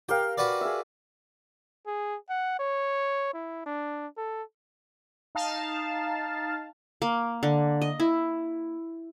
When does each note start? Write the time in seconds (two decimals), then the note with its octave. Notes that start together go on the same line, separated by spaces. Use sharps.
0.09 G4 A#4 F5 G5
0.38 F#4 B4 D5
0.61 G#4 E5
1.87 G#4
2.30 F#5
2.59 C#5
3.34 E4
3.66 D4
4.17 A4
5.35 D#4 F5 A5
7.02 A#3
7.43 D3
7.82 D#5
8.00 E4